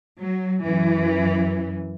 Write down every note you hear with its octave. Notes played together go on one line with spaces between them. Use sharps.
F#3
F#2 E3